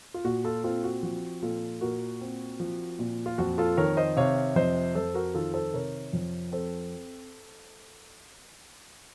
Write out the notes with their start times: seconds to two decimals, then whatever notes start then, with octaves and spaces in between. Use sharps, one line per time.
0.14 F4
0.25 A#2 F#4
0.45 F4 A4
0.64 C4 F4 A4
0.84 F#4
1.03 F3 F#4
1.43 A#2 F4 A4
1.81 A#2 F#4 A#4
2.21 C4
2.60 F3
2.99 A#2
3.26 F4
3.38 F2 F#4
3.58 F4 A4
3.77 D#3 A#4 C#5
3.97 C5 D#5
4.17 C3 C#5 F5
4.56 F2 C5 D#5
4.95 F2 A4 C5
5.14 F#4 A#4
5.34 D#3 F4 A4
5.54 A4 C5
5.74 C3 A#4 C#5
6.13 F2
6.52 C4 A4 C5